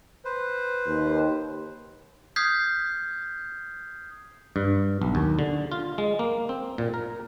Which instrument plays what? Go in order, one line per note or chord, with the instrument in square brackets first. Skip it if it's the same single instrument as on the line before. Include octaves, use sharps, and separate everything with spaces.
[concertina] B4 C5
[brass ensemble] D#2
[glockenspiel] D#6 F6 G6 G#6 B6 C7
[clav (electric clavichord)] G2
B1
D#2
D3
F4
G#3
A#3
C4
A#2
A#4